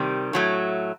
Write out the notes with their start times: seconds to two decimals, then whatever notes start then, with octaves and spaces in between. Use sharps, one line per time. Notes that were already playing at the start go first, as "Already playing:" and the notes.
Already playing: C3 D#3 G3
0.33 A2 F#3 A3